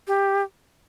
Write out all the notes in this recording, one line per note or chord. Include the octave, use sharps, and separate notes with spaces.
G4